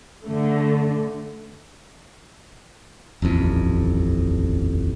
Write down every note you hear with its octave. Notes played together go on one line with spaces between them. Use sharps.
D3 A3
D#1 A1 F2